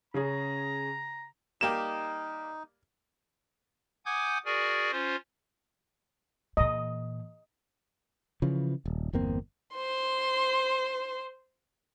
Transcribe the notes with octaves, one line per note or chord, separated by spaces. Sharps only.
C#3 C#4 G#4 A#5
G3 A#3 D#4 G4 E7
F#5 G#5 D6 D#6 G6 G#6
F#4 G#4 A#4 D5 G#5
C#4 F4 C5
A#2 E3 D#5
C#3 E3 F3
D#1
G1 E2 A#3 C4
C5 C6